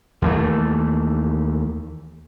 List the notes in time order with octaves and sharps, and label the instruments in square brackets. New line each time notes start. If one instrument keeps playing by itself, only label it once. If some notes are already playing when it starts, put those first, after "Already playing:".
[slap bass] D#2 E3 A3